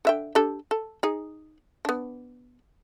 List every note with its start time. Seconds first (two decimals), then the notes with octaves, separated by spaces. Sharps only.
0.05 D3 E5 G5
0.35 D4 G4 A4
0.71 A4
1.03 D#4 G#4
1.85 B3 D4